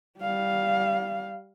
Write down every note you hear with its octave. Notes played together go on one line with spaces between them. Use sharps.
G3 F5